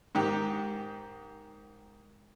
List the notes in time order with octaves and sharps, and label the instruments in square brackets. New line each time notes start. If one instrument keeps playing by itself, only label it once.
[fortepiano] G#2 D#3 G4